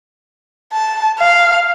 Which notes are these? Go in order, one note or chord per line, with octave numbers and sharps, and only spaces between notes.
A5
F5